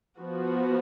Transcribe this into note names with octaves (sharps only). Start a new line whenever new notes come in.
F3 B3 F#4